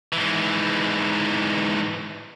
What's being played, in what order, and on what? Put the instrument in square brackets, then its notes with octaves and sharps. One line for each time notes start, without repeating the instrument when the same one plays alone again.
[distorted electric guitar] G#2 E3